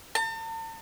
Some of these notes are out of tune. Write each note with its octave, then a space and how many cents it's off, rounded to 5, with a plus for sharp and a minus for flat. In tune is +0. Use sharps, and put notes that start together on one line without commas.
A5 +45